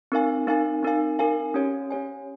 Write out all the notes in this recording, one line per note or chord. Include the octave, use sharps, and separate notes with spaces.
C4 D#4 A#4 F5 G#5
C4 D#4 A#4 F5 G#5
C4 D#4 A#4 F5 G#5
C4 D#4 A#4 F5 G#5
C#4 G4 C#5 G#5
C#4 G4 C#5 G#5